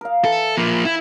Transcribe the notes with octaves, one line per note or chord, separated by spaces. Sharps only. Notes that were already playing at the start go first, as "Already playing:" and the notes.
A#4 F5
E3 A4
F3 A#3
E4